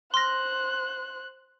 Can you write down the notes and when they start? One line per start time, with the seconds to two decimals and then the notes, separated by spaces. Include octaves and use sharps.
0.14 C5 C6 F6 F#6 A#6